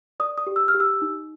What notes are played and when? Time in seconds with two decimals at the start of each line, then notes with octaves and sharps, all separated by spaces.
0.20 D5 D#6
0.38 D#6
0.47 G4
0.56 E6
0.68 F6
0.74 G4
0.80 E6
1.02 D#4